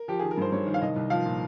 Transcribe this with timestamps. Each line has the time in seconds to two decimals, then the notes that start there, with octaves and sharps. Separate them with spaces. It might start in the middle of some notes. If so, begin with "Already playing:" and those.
Already playing: A#4
0.08 F3 G4
0.19 D#3 G#4
0.31 A#4
0.37 G2 C5
0.52 G2 C#5
0.67 D#3
0.74 F5
0.82 C2 D#5
0.96 C2
1.10 F3 F5
1.26 A#2